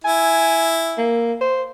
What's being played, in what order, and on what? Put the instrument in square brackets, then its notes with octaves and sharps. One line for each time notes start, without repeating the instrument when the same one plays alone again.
[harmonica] E4 [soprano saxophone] G#5
[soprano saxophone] A#3
C5